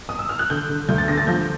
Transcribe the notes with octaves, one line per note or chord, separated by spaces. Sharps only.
D#6
E6
F6
F#6
D3 G6
D3
D2 G6
A6
D3 A#6
A6
F3 G6